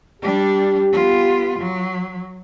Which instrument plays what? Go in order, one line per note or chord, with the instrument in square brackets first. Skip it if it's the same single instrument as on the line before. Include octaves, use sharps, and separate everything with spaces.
[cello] G3 D4 [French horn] G4
[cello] B3 F4
F#3